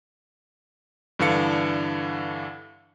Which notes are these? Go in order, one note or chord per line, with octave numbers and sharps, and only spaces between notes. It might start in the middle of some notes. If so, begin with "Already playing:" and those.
G2 D3 E3 D4 F5 C#7